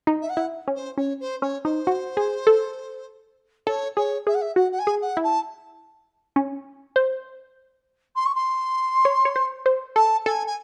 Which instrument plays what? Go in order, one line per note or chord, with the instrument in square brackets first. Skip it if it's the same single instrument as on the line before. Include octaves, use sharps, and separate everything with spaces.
[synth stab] D#4
[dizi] E5
F#5
[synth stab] E4
C#4
[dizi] C5
[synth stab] C#4 [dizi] C#5
[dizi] C5
[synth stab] C#4 [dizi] C#5
[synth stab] D#4 [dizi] C5
[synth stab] F#4
G#4
A4
[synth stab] A4 [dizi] C#5
[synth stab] G#4 [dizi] C#5
[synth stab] G#4 [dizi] E5
[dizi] F#5
E5
[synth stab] F#4 [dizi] F#5
[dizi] F#5
G#5
[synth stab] G#4
[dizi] F#5
[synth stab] E4
[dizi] A5
[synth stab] C#4
C5
[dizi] C6
C#6
C6
[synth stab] C#5
C#5
C5
C5
[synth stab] A4 [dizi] A5
[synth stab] A4 [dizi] G#5
[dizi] G#5